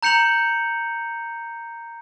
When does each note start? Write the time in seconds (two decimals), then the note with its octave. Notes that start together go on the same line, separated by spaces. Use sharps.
0.03 A#5 G6 C#7 F7 F#7